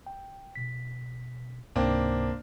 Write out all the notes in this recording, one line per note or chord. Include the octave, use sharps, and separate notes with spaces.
G5
B2 B6
C#2 G#2 C3 A#3 C4 D4